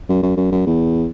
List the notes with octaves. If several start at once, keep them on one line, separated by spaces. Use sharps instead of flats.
F#2
F#2
F#2
F#2
E2